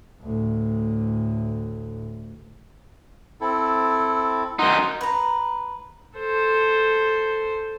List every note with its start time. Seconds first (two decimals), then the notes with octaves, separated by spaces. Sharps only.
0.22 D2 A2
3.41 C4 E4 A4
4.59 F#2 D#4 F#5 C6
5.01 B4 A#5
6.18 A4 C5